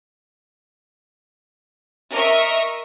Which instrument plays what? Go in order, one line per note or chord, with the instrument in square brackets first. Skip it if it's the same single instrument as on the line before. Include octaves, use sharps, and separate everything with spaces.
[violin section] A#4 D#5 E5 C#6